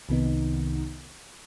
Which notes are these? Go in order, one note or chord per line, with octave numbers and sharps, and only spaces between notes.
C2 C3 D#3 B3 D#4